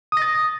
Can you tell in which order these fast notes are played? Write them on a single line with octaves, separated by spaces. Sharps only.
D#6 A#6 A6